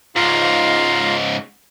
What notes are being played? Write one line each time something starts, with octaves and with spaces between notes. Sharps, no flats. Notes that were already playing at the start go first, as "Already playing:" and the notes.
G#2 C#3 F4 F5 A#5